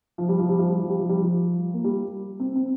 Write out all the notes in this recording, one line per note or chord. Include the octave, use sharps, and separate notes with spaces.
F3
G3
F3
G3
F3
G3
F3
G3
F3
G3
F3
A#3
G3
C4
C4